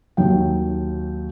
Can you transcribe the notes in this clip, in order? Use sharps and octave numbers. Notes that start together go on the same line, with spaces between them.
D#2 F#3 G5